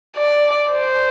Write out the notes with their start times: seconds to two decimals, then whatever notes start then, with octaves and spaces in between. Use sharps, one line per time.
0.17 D5
0.73 C5